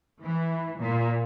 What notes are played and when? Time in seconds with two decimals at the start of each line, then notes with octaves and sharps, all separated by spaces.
0.23 E3
0.80 A#2